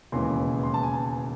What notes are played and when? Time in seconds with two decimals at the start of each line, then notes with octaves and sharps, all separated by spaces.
0.12 E1 D#2 C#3 E3 G#3 C6
0.63 C6
0.74 A5
0.83 G#5
0.94 A5